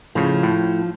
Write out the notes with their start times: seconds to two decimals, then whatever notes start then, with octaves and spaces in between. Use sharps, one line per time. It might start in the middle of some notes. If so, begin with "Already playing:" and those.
0.15 A2 C#3 F3
0.43 A2